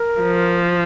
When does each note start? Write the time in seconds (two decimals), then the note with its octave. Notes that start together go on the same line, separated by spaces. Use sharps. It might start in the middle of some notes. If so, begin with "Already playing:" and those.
Already playing: A#4
0.21 F3